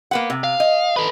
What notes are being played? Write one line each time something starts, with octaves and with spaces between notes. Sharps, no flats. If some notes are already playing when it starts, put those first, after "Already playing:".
A#3 B3 F#5
C3
F5
D#5
A4 B4